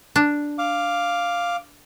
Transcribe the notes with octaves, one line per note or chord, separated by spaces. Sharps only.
D4
F5 D6